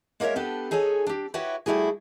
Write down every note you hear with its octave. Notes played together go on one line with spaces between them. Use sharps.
G#3 A#3 A#4 B4 C#5 E5
B3 D4 G4 A4 B4
D#4 G#4 A4 C#5 G#5
D4 G4
E4 F#4 G4 B4 C#5
G3 A3 E4 F#4 G#4